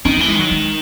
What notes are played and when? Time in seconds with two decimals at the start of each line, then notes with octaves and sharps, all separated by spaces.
0.05 D#3 C#4
0.17 E3 A3
0.28 G#3
0.36 D#3 F#3
0.51 G#3